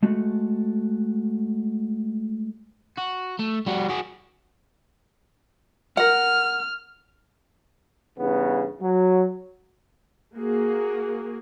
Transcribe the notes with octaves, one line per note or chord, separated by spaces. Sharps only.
G#3 A3 F#4 A4
F#4
A3
G3 F#4
F#4 G#4
A#4 F#5 F6
E2 G2 C#3 B3
F#3
A#3 F#4 G#4